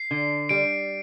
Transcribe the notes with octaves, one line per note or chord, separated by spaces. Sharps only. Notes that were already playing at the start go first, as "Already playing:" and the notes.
Already playing: C7
D3
G3 D7